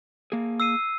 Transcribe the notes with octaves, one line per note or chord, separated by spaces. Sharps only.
A#3 G#4
E6 C7 D#7